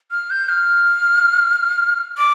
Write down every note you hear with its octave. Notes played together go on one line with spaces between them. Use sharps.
F6
G6
F6
D6